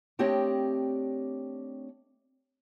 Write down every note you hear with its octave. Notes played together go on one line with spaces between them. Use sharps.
A3 C4 D4 G4 C#5 D#5